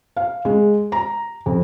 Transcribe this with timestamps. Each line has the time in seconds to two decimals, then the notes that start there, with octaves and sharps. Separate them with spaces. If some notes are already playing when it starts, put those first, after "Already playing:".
0.17 F5
0.45 G#3
0.92 A#5
1.46 F2